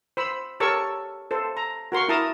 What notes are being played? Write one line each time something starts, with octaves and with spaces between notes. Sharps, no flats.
C5 B5 E6
G4 A4 A#4 C#5 C#6 E6
A4 C5
A#5
F#4 A#4 C6 C#6
E4 A#4 A5 A#5 D#6